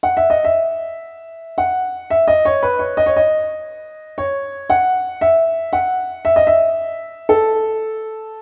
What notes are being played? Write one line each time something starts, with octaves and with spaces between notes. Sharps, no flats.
F#5
E5
D#5
E5
F#5
E5
D#5
C#5
B4
C#5
D#5
C#5
D#5
C#5
F#5
E5
F#5
E5
D#5
E5
A4